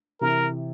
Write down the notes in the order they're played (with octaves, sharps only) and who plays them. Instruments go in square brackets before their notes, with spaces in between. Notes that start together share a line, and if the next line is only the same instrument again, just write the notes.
[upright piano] C3 E3 [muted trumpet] A#4